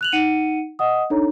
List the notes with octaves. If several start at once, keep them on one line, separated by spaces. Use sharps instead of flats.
F#6 F7 F#7
D#4 F#5 C#7 D#7
D#5 F#5 D#6
D4 D#4 A4 C#5 A#5